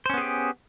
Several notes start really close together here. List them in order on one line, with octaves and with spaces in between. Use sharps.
C5 C#4 B3 G#4 G4